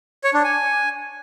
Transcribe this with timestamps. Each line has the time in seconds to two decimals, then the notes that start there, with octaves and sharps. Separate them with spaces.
0.24 C#5
0.34 D4
0.44 G#5